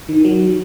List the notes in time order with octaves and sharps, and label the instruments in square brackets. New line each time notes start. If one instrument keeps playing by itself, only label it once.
[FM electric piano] D#3
F#3